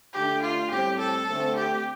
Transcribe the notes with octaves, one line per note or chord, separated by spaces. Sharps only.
D3 A3 D4 G4
F4
A2 G3 C4 G4
A4
D3 A3 C4
G4